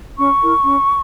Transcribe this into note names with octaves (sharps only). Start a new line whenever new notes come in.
C#4 C#6
E4 A#4
C#4